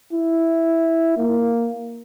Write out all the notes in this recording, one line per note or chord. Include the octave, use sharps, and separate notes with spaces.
E4
A#3